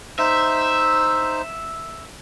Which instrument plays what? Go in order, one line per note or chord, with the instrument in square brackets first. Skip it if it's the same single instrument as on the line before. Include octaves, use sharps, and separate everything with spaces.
[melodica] D#4 C5 [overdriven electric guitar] E5